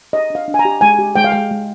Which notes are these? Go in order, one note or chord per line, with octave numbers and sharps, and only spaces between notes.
G4 D#5
D4 F5
D4
G#5
A#5
G4
G#3 G#5
G4
G#3 G5
F5
G#3 G5
G#3